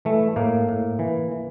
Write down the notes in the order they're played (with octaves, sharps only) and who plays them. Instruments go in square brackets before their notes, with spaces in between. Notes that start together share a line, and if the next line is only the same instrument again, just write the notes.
[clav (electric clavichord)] E3 A3
A2 A#3
A2
E3
E3